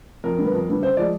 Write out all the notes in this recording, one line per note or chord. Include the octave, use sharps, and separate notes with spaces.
F2 A#4
D3 G3 B3
F2
D3 G3 B3
C#3 C5
F3 G#3 D5